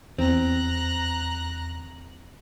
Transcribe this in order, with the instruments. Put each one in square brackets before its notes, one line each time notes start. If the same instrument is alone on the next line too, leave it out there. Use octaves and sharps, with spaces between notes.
[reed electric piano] E2 [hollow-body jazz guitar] C4 [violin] A#5 F#6